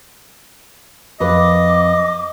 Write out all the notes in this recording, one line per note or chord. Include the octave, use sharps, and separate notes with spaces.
F2 B4 D#5 D6